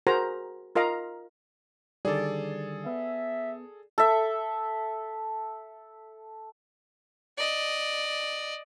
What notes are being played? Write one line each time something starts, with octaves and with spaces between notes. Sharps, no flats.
F#4 G#4 A#4 C5 A#5
F4 A#4 D#5 F5 A#5
D3 D#3 G3 G#4 A4 D5
B3 E5
A4 E5
D5 D#5